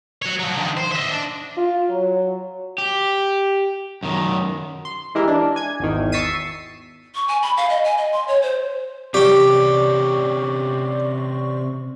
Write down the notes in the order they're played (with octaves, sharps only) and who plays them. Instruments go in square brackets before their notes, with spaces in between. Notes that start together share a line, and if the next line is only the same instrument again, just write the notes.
[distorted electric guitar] F#4 C#5
F3 F#3
D3 D#3
C5
D#5 E5
D4
[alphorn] F4
F#3
[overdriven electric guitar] G4
F#2 D#3
[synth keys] C6
E3 G#3 E4 G4 A#4
D4
G#5 G#6
G#1 E2 D#3
C#6 E6 A6 B6 C7 D#7
[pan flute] C#6
G#5
B5
F5
D#5
G#5
D#5
C6
C#5
C5
[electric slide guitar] C3 C4 C#4 [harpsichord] G4 G5 [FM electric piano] D5 C#6